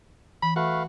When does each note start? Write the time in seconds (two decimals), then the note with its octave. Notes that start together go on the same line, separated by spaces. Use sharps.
0.43 E3 B5
0.56 A3 F#4 B4 F5